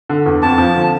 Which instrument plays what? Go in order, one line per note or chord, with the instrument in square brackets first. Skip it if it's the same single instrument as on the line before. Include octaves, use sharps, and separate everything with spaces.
[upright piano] D3
E2
[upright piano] F2 [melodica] A5
[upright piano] F3
D3